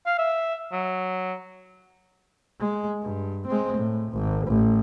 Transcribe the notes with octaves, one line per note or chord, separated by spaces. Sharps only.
F5
E5
F#3
G#3
G2
G#3 C4
A2
G#1
A1